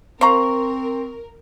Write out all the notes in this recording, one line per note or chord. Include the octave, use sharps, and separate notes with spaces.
C4 A#4 C5 F5 A#5 C6 C#6